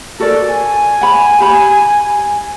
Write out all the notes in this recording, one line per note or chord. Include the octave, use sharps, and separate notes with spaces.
F#4 A4 A#4 D5
G#5
F#5 B5
G4 B5